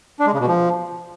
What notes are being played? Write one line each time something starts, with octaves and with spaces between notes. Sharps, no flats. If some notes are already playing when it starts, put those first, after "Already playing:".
D4
G#3
C#3
B2
F3